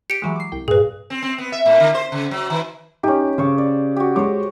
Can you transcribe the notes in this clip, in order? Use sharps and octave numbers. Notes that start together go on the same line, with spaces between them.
G4 C#7 D7
E3 F#3 G#3
D6 C7
C2 G5
G2 A#2 G#4 B4
C4
C4
B3
E5
A2
D3
C5
C#3
F#3
D#3
C#4 D#4 G4
C#3 C5 C#6 D6
D5
F#4 G4
G#3 C5 C#5 D6